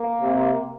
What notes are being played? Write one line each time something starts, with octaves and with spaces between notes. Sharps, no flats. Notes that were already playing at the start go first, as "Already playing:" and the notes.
Already playing: A#3
C3